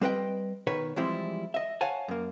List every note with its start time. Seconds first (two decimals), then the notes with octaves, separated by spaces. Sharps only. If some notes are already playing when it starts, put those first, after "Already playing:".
0.01 G3 C4 B4 D#5 G5
0.67 B2 D#3 B4 C#5
0.96 E3 F3 G3 G#3 C4 E4
1.54 D#5 E5
1.81 C#5 F5 F#5 G#5 A5
2.08 F#2 A#3